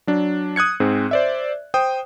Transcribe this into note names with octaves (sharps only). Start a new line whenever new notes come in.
F#3 D4
D#6 F#6 G#6 C#7
G#2 C4 G#4
C5 D5 E5
C5 G5 D#6